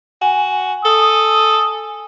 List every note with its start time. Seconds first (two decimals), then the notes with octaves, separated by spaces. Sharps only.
0.22 F#4 G#5
0.85 A4 D#6